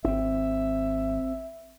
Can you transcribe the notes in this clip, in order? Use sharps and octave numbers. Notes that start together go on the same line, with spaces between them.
G#1 C4 D4 E5